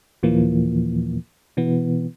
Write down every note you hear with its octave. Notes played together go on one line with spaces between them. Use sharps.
D#2 A#2 E3 F3 A#3
B2 E3 B3